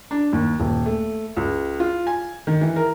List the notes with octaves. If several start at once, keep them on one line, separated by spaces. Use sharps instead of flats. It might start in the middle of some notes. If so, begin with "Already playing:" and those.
D4
D#2
D#1
A3
C#2
F4
G#5
D#3
E3
A#4